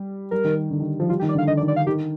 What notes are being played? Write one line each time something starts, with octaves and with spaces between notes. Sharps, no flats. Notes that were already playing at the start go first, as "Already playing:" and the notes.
Already playing: G3
G3 A#4
D#3
D3
D#3
F3
G3 F4
G4
D#3
D5
D3
F5
D3 D#5
D5
D#3
D5
F5
D#3 G4